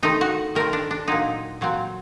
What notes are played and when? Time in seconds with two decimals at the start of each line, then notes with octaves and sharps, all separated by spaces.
0.03 D#3 A3 C4 D#4
0.21 F#4
0.55 D#3 A3 C4 A#4
0.73 D4
0.91 D4
1.08 A#2 F#3 C4 D#4
1.61 A#2 F#3 C4